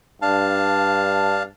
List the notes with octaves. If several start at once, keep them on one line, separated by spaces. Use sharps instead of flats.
G2 D4 F5 A5